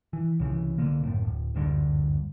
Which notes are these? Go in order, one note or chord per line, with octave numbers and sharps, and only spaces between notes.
E3
C2 C#3 E3
C2 D3 A#3
G#1 F#2 A2
D1
F#1 D2 G2 D3